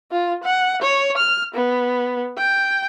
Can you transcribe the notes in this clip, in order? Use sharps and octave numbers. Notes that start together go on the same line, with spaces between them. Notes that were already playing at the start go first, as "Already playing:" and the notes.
F4
F#5
C#5
F6
B3
G5